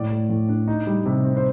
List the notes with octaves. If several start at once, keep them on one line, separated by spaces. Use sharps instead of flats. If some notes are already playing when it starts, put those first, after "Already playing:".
Already playing: A2 D5
A3
A2
D4
D#4
G3
C3
C4
C5